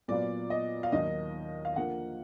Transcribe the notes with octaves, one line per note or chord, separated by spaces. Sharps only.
A#2 F#3 B3 F4 D5
D#5
F5
D#2 D#3 F#3 D#5
F5
D3 F3 A#3 F#5